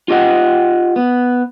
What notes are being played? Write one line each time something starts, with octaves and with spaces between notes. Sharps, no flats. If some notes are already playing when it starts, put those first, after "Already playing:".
F4 G4 D#5 F#5
B3